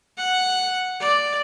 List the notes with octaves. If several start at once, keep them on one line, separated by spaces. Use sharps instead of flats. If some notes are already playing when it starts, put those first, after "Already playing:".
F#5
D5